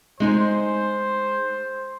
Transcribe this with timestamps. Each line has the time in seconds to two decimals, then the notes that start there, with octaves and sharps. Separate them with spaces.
0.20 G#3 D#4 G#4 C5